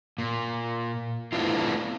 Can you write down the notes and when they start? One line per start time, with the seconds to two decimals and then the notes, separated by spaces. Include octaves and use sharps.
0.18 A#2
1.32 A3 B3 C4 D4 E4 F4